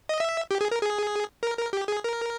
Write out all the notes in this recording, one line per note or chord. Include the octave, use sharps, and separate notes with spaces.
D#5
E5
G4
G#4
A#4
G#4
A#4
A#4
G4
G#4
A#4